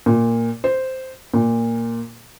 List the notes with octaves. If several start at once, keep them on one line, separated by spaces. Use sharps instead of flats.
A#2
C5
A#2